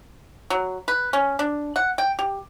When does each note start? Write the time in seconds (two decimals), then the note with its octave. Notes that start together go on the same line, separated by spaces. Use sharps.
0.50 F#3
0.88 B4
1.13 C#4
1.39 D4
1.76 F#5
1.98 G5
2.19 G4